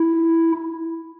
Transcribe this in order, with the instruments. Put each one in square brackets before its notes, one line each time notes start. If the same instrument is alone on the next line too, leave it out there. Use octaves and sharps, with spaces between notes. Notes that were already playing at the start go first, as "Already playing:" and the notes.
Already playing: [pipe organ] E4